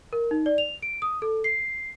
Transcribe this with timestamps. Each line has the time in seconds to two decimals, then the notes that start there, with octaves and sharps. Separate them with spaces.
0.13 A#4
0.31 D#4
0.46 D5
0.58 F7
0.82 D7
1.02 D#6
1.22 A4
1.44 C7